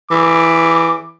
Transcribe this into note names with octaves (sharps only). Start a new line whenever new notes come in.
E3 D6